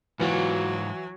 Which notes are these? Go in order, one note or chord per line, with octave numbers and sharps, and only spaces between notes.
G#2 E3 F#3 F4 F#4